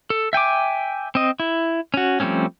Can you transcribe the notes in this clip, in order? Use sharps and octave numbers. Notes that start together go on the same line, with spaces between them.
A4
E5 G5 G#5 D6
C4 D#5
E4
C#4 F#4
F3 G3 A3 C4 C#4